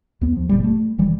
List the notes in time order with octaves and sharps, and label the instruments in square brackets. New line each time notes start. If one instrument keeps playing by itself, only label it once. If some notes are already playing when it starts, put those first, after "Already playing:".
[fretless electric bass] D#2 B3
F3
F#1 A#2 G3
A3
F1 E3 G3